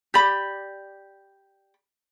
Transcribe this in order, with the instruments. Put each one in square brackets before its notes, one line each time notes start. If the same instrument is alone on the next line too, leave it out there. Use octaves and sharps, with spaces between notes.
[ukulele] G4 D5 B5